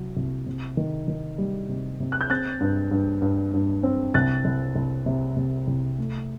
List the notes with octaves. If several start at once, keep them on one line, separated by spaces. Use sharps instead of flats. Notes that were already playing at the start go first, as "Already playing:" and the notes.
Already playing: C2 F#3
C2
C3
D#3
D#3
G3
C3
C3
F#6
G6
C4 F#6 A6
G2
G2
G2
G2
C4
C2 F#6 A6
C2
C2
C3
C3
C2
A3